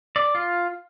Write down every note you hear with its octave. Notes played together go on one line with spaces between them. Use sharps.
D5
F4